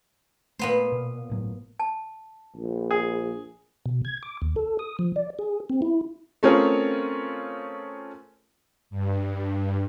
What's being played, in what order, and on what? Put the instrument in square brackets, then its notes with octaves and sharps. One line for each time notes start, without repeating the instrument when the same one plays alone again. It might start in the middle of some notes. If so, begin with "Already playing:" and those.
[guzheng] A#2 B3 C5 [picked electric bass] A3
[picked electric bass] B2
G1 A2 F#3
[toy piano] A5
[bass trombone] A#1
[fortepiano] G#4
[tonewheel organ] B2
G#6
D6
D#2
A4
D#6
F3
D5
G#4
C4
E4
[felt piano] A3 C4 C#4 F4 G#4 A#4
[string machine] G2